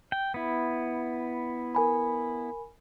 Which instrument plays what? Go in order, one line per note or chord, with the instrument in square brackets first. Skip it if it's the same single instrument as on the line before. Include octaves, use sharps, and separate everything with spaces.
[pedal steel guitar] G5
B3 E4
[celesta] A#4 G#5 B5